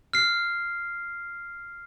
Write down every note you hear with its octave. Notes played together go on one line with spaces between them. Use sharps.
F6 C7